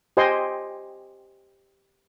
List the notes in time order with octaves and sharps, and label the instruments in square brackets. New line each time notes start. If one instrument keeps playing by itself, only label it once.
[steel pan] G4 C5 D#5 G5 G#5 C6